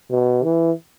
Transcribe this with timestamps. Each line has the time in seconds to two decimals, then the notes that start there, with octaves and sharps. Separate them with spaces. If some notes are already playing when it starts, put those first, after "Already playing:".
0.10 B2
0.43 E3